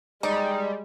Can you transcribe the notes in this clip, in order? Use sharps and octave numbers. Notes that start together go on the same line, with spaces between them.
G3 G#3 D#4 D5